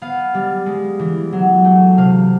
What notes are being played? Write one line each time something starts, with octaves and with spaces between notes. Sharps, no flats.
B3 F5
G3
G#3
E3
F#3
A3
C3 F5